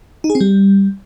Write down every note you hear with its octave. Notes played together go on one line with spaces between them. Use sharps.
D#4
G#4
C4
G3